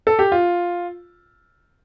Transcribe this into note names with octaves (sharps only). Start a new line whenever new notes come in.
A4
G4
F4